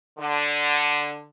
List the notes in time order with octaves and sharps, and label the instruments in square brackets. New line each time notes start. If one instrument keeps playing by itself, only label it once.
[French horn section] D3